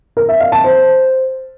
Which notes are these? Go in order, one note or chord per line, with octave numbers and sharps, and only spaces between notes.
A#4
E5
F5
A5
C5